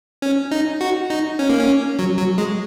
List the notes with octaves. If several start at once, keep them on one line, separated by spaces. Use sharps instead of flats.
C#4
D#4
F#4
D#4
C#4
A#3
C#4
F#3
F#3
G#3